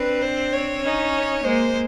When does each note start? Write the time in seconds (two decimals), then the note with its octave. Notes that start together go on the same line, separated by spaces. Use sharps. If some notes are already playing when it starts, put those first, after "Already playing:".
Already playing: C4 D4 B4
0.22 C5
0.53 C#5
0.83 C#4 D#4
1.44 G#3 A#3 C5